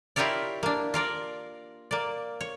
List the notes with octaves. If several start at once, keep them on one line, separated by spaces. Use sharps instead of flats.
E4 F4 G4 A#4 C#5 D5
A#3 D4
F4 A#4 D5
A#3 D5
C#5